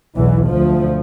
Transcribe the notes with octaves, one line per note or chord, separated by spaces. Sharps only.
B1 E2 E3
D2 F3